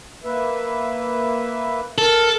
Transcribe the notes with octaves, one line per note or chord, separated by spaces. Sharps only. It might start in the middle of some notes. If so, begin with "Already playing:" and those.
A#3 B4 E5
A4 A#4